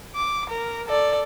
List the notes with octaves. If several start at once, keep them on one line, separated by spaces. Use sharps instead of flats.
D6
A#4
A4 D5